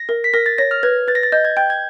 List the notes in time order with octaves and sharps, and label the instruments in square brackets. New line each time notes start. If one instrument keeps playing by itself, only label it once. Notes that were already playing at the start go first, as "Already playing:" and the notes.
Already playing: [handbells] A#6
[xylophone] A#4
[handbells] B6
[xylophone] A#4 [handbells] A#6
[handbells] A6
[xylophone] C#5 [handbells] A#6
[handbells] F6
[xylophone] B4 [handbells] G#6
[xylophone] B4 [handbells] A6
[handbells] A#6
A6
[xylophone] D#5 [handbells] G6
[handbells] G#6
[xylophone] G5 [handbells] G6
[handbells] G#6